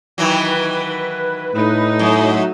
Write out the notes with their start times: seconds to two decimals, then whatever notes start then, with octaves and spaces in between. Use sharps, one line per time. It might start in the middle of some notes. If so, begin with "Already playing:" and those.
0.18 D#3 E3 F#3 B4
1.55 A2 A3 D#4
1.99 F#2 F#3